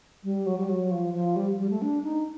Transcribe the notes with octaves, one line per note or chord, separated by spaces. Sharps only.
G3
F#3
G3
F#3
F3
F3
G3
G3
A3
D4
D#4